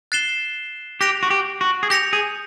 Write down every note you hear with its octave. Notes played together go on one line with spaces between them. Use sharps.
F#6 A6 C7 E7 G7
G4 F#6 A#6 D7 F7
F#4
G4
F#4
G#4
G4 G6 A#6 C#7 F7
G#4